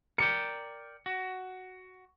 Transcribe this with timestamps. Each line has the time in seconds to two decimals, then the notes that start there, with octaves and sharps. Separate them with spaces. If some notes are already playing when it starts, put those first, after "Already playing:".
0.18 A#4 D5 G5 C#7
1.06 F#4